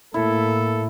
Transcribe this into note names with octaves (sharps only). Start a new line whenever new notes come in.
A2 A#3 E4 A4